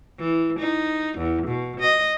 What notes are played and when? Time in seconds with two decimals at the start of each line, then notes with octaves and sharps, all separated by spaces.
0.19 E3
0.59 D#4
1.18 E2
1.47 B2
1.80 D#5